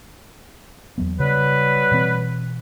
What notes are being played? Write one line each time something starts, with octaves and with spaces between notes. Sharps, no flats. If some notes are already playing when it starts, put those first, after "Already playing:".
E2 F#3 B3
C#3 F#3 G3 B4
B2 E3 C4